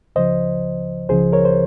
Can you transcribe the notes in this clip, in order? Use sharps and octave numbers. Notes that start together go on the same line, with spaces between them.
C#2 C#3 F3 C5 D#5
C#2 C#3 F3 G#4 C5
A#4 C#5
C5